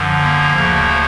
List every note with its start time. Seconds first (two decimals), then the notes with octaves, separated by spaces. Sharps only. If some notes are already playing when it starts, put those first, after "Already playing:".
Already playing: F#2 D3 F3
0.21 A#3
0.53 D2 C#3 F3